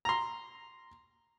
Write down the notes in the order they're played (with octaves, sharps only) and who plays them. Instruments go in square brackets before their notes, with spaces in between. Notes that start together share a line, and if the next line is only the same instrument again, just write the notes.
[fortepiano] A#5 C6